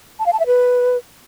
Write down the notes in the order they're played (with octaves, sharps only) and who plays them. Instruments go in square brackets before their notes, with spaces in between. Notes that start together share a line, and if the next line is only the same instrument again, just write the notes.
[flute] A5
F5
A5
E5
B4